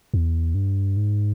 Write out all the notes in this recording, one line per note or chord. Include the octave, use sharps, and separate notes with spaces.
E2
G2
G#2